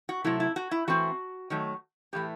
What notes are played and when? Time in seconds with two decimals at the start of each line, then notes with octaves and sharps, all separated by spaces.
0.09 F#4
0.24 C3 F#3 A3 E4
0.40 E4
0.56 F#4
0.71 E4
0.88 E3 A3 C4 F#4
1.50 D#3 F#3 A3
2.13 A2 E3 A3 G4